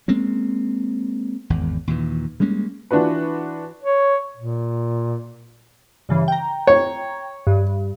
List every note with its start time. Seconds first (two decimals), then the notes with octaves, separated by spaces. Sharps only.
0.08 G#3 A#3 C4 C#4
1.50 G#1 E2
1.87 D#2 A#2 E3
2.40 G3 G#3 A#3 C#4
2.91 E3 D4 F4 F#4 B4
3.83 C#5
4.36 A#2
6.09 G2 C#3 E3
6.28 G5 A#5
6.67 C#5
7.47 G2